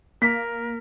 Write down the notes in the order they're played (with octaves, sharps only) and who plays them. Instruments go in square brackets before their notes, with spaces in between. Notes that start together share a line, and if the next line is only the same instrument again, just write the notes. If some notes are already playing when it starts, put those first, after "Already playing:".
[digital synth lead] A#3 [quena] A#4 [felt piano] B6